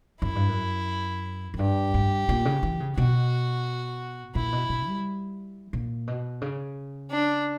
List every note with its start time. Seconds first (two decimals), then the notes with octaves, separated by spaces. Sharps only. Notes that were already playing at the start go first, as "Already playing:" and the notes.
0.22 F#2 E4
0.35 G2
0.49 F#2
1.54 F#2
1.59 G2 G4
1.94 G2
2.29 A#2
2.45 C#3
2.63 E3
2.80 C#3
2.97 B2 F#4
4.35 A#2 E4
4.52 B2
4.69 B2
4.87 G3
5.73 A#2
6.07 B2
6.42 C#3
7.11 D4